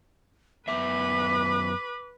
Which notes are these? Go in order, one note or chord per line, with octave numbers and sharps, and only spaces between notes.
F#2 B3 B4 E5 D6